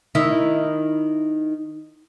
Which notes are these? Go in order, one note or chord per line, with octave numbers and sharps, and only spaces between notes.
D#3 E4